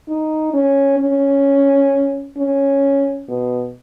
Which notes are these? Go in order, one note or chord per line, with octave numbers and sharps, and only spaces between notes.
D#4
C#4
C#4
C#4
B2